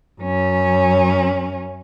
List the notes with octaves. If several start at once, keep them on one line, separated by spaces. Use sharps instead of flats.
F#2 C#4